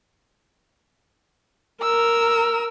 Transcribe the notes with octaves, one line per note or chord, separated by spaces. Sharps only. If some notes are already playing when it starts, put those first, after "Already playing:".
A#4 E6